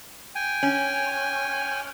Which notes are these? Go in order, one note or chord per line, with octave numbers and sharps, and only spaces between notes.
G5 G#5
C#4